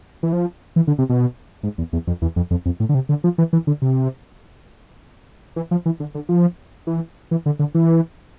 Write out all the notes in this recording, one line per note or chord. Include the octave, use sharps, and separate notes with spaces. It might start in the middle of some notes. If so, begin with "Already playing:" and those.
E3
F3
E3
D3
C3
B2
G#2
E2
E2
F2
E2
F2
F2
F2
A2
D3
C3
D3
F3
E3
E3
D3
C3
E3
F3
E3
D3
D3
F3
E3
E3
D3
D3
E3